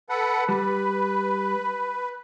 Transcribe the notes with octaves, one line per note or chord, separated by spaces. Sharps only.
A4 B4 F#5
G3 B4